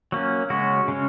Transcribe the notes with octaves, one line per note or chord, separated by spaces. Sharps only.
F#3 A#3 C#4
C#3 G#3 C#4 F#4
C#3 G#3 C#4